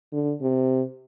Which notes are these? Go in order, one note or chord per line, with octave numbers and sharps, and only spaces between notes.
D3
C3